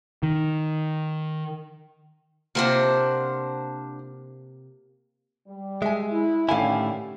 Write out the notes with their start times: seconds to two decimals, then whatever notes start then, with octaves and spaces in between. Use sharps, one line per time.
0.23 D#3
2.55 C3 A#3 D4 F4 C5 F#5
5.47 G3
5.82 G#3 E5 G#5
6.11 E4
6.49 A2 D3 D#3 C#4 E4 G4 F5 G#5